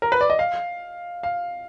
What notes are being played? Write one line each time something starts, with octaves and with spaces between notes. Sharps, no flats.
A#4
B4
D5
D#5
F5
F5